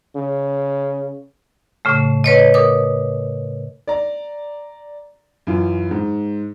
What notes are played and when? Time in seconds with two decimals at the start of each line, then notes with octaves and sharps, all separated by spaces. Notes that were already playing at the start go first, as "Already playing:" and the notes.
0.16 C#3
1.85 A2 C#3 A3
2.24 B4 C#5 D#5
2.54 A#4 D6 D#6
3.87 D5 A#5
5.47 F#2 E3 F4
5.91 G#2